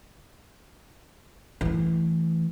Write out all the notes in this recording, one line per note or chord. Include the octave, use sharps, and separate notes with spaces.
E3 A3